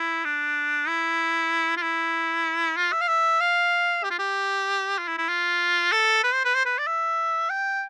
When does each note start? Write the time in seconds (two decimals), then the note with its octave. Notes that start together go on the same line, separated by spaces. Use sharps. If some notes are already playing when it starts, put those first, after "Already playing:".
Already playing: E4
0.25 D4
0.88 E4
1.77 F4
1.82 E4
2.77 F4
2.92 E5
3.01 F5
3.08 E5
3.40 F5
4.03 G4
4.10 F4
4.19 G4
4.98 F4
5.08 E4
5.18 E4
5.29 F4
5.92 A4
6.24 B4
6.34 C5
6.44 B4
6.55 C5
6.66 B4
6.78 D5
6.87 E5
7.50 G5